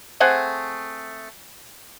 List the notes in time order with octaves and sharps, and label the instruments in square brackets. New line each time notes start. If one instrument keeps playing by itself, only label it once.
[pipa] A3 C4 G#4 F#5